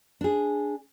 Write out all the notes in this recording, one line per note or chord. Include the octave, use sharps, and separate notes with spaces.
D4 G#4